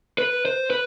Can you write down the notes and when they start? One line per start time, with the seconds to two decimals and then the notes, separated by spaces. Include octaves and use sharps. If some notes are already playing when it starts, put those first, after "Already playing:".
0.18 B4
0.45 C5
0.70 B4